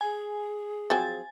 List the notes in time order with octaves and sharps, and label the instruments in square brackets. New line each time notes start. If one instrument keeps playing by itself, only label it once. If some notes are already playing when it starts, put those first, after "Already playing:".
[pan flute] G#4 [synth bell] G#5
[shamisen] F3 F#3 C4 [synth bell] G#5 A6